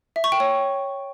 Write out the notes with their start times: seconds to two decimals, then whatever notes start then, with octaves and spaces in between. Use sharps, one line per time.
0.16 E5
0.24 C#6
0.32 G5
0.40 C#5